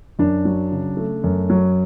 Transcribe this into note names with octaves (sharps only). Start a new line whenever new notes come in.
F#2 D4
F#3
C#3
A3
F#2
F#3